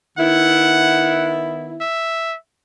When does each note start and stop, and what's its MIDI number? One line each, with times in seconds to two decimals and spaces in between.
0.18 1.83 51
0.18 1.83 59
0.18 1.83 64
0.18 1.30 78
1.81 2.36 76